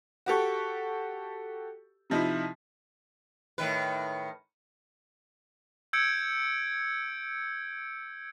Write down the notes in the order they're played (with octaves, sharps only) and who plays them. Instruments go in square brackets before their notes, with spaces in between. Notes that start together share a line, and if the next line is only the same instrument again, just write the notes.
[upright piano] F#4 G4 A4 C#6
C3 F3 D#4 E4
[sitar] A2 D#3 B4
[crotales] E6 G6 G#6 C#7 D7